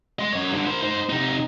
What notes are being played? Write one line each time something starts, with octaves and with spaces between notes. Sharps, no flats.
D#5 C6
F#2 C#5
G2 D3
A#4 C5
D#4 C5
C3 D#4